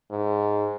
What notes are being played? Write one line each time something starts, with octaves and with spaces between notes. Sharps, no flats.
G#2